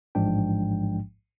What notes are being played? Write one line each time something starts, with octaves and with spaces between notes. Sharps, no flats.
A1 G#2 F3 G#3 D4 G5